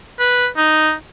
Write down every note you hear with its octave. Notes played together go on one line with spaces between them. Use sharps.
B4
D#4